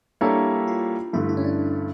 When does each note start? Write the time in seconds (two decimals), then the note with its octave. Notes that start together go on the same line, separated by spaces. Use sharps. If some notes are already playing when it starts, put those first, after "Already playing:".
0.21 G3 A#3 D4 E4 A4 C#5
0.68 F4
1.13 G2 D3 A3 E4
1.29 E4
1.37 C#4
1.44 D4